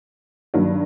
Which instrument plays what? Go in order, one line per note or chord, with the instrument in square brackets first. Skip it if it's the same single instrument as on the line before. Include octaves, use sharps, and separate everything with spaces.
[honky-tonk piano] G2 D#3 F#3 A#3